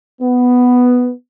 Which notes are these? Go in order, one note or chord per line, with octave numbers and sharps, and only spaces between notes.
B3